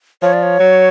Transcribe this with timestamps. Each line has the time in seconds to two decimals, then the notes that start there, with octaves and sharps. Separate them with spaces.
0.22 F3 C#5
0.33 D5
0.43 C#5
0.60 F#3